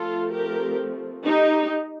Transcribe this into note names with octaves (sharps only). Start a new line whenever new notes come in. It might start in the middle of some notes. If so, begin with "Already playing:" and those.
Already playing: F3 A3 C4 F4 A4
G4 A#4
D#4 G4